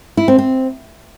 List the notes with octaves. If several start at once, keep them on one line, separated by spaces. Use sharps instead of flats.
E4
C4
C4